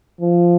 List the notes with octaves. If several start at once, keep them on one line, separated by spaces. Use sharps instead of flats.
F3